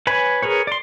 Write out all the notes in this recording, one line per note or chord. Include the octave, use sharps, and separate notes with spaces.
B4 C#5 G#5 B5
G#4 A#4 B4 C#5
D5 C6